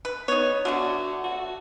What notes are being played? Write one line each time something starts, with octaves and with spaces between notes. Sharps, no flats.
B4
B3 D#4 C#5
D3 A3 D4 F#4
F#4